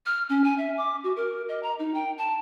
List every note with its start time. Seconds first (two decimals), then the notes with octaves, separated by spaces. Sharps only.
0.06 F6
0.29 C#4
0.44 G#5
0.58 E5
0.78 D6
1.04 F#4
1.16 A#4
1.49 D#5
1.63 A#5
1.79 D#4
1.94 G5
2.18 A5